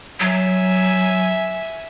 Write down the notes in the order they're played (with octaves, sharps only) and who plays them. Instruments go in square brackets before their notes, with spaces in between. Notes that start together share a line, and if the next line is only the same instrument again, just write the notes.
[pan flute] F#3 [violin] E5 G#5